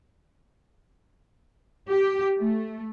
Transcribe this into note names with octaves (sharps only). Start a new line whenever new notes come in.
G4
A3